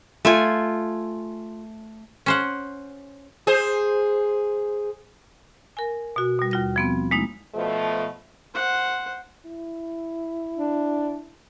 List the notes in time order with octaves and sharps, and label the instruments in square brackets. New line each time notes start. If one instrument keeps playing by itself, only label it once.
[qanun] A3 F4 G#5
[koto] C#4 C5 F#5
[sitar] G#4 C5
[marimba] A#4 G#5
B2 F#4
B2 G3
D#2 F4 A#6
F3 B3 C4
G#3 A#3 D#4 E4
[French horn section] B2 F3 A3
[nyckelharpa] C5 F#5
[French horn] E4
[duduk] D4